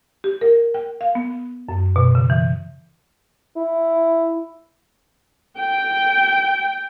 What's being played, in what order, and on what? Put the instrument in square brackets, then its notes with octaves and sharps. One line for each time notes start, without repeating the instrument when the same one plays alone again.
[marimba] G4
A#4
G5
F5
B3
F#2
B2
C#3
E3
[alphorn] E4
[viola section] G5